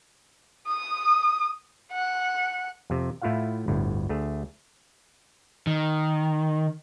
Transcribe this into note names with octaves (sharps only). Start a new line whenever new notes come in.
D#6
F#5
F2 C3
A2 A3 E4 F4 F5 F#5
G1 D2 A2
D2 A3 G#4
D#3